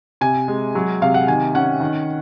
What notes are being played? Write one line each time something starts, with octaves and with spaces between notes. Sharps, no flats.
C3 G#5
G#3
F#3
C3 F5
F#5
D#3 G#5
C#4 F#5
D#3